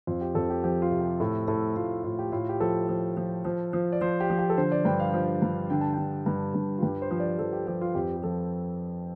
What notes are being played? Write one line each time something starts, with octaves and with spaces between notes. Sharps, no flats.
F2 F4
G4
F2 A4
G4
F3 G4
F4
C3
G4
A2 A4
A2 A4
A2 F4
A2 F4
G4
A2 F4
G4
F3 A4
F3
F3
F3
F3
D5
F3 C5
G4
F3
G4
A4
D3 C5
D5
G2 G5
F5
F3
G2
D3 G5
A5
G5
D3
G2
G2
F4
G2 G4
C5
F3
D5
F3 A4
G4
F3 G4
F4
F2 G4
G4
F3 A4